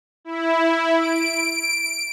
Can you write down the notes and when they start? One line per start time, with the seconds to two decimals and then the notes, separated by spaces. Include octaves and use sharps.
0.25 E4
0.98 D7